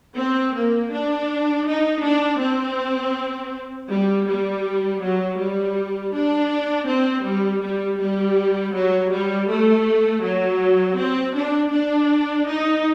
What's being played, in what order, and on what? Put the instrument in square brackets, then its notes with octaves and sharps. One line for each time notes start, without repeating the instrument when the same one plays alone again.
[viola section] C4
A#3
D4
D#4
D4
C4
G3
G3
F#3
G3
D4
C4
G3
G3
G3
F#3
G3
A3
F#3
C4
D4
D4
D#4